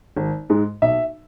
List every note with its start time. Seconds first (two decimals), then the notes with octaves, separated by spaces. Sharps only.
0.17 G#1
0.50 G#2 G#3
0.82 B1 E5